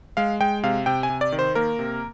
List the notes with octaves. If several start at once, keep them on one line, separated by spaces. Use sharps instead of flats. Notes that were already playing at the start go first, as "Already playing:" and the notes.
G#3 F5
G#3 G5
C3 F5
C3 G5
G#5
C3
D5
D#3
C5
A#3 A#4
C3